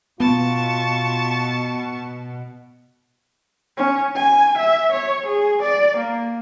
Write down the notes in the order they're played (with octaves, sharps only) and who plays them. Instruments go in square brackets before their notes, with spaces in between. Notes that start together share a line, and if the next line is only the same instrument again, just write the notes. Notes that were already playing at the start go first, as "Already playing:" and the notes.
[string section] B2 [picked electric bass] B3 [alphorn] F4 [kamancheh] A5 C#6
[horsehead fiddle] C#4
G#5
E5
C#5
G#4
D5
A#3